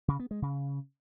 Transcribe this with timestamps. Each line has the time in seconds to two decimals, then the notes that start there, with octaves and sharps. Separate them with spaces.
0.08 C#3
0.19 B3
0.31 G#3
0.42 C#3